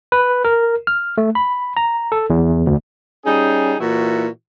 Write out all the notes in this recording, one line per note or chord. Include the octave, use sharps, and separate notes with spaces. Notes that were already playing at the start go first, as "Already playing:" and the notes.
B4
A#4
F6
A3
B5
A#5
A4
E2
D2
G3 C#4 D#4 G#4
A#2 E3 E4 F#4